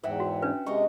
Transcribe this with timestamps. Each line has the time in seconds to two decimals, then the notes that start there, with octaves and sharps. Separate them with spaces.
0.03 E2 G#2 F3 F#3 B3 E5 F#5 G5
0.20 F#4
0.42 C#4 D4 B4
0.66 C3 G#3 D#4 F4 D#5 C#6